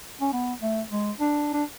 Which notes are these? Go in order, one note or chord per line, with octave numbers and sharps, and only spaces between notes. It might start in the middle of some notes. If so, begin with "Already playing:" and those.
C#4
B3
A3
G#3
D4
D4